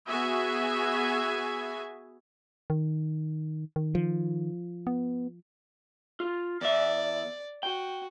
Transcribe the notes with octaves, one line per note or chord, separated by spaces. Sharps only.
B3 F#4 G#4 E5 G#5
D#3
D#3
F3
B3
F4
E2 D5 E5
F#4 G5